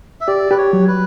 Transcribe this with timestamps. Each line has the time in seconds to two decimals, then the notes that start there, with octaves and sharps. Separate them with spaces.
0.21 E5
0.27 G4 D5
0.51 G4 B4
0.58 C#5
0.73 F#3
0.87 B4